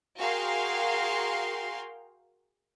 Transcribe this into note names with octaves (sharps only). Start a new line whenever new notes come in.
F#4 G#4 A#4 F5 G5 C6